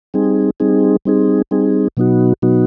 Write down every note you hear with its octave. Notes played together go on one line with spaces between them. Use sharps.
G3 C4 D#4 G#4
G3 C4 D#4 G#4
G3 C4 D#4 G#4
G3 C4 D#4 G#4
B2 F#3 B3 D#4 F#4
B2 F#3 B3 D#4 F#4